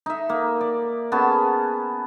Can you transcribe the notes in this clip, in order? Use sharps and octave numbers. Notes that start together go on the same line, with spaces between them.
D#4 E5
A#3
D5
B3 C#4 G#4 A5